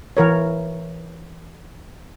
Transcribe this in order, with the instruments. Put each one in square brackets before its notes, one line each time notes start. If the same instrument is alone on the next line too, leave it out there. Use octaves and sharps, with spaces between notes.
[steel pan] E3 A#4 C#5